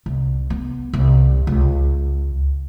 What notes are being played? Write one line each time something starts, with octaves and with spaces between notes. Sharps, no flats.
C2
B3
C2
C#2